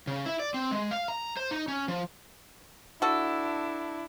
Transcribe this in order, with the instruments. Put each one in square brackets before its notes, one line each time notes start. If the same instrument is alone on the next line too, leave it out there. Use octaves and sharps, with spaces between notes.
[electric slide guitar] C#3
E4
D5
C4
G#3
F5
A#5
C5
D#4
C#4
F3
[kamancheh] D4 E4 [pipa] F#4 A4